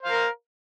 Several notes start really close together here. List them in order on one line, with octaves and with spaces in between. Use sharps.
C5 F5 A#4